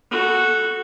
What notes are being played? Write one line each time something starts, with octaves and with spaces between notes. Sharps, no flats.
F#4 A4